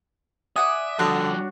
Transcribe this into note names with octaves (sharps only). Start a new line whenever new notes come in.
D5 E5 F#5 G#5 D#6
D3 F3 G3 D4 F#4 C#5